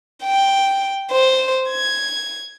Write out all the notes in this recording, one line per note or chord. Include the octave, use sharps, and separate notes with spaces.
G5
C5
G#6